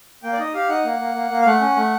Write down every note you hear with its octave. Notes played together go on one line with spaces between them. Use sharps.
A#3 G5
D5
D#4 D#5
G4 F5
D#4 F#5
A#3
A#3
A#3
A#3
F5
A3 F#5
C#4
A3